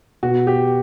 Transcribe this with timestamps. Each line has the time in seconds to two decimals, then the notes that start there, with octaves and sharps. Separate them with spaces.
0.23 B2 F#4
0.47 G4